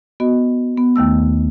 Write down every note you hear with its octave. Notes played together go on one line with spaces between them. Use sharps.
B3 F#4 D#5
B3
D#2 D#3 A3 E6